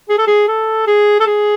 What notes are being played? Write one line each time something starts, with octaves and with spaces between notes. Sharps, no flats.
G#4
A4
G#4
A4
G#4
A4
G#4